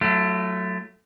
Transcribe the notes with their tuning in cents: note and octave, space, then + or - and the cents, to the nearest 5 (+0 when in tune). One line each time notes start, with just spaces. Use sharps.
F#3 +0 A3 +0 F4 -40